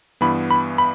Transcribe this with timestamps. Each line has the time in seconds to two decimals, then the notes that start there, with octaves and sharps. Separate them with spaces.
0.21 G2 E3 B3 B5
0.51 B5
0.78 B5